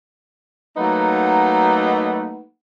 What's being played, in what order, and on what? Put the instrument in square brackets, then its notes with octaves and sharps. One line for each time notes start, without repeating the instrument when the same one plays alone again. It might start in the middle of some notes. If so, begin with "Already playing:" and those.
[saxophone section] F#3 A3 A#3 D#4 B4 F#5